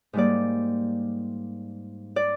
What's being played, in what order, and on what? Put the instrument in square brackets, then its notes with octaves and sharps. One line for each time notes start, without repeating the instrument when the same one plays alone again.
[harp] G#2 G3 A#3 D5
D5